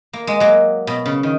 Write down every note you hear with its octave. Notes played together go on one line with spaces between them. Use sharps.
A#3
G#3
F#3 A#3
B2
C#3
D#3